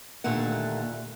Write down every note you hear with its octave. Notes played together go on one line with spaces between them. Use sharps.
D#2 A#2 D3 A3 F#5